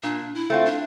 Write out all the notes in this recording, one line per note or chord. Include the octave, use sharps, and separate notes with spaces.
A#2 D4
E4
A3 C4 F4
D4